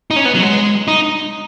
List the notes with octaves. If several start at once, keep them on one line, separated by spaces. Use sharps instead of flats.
D#4
C#4
B3
F#3
G#3
D#4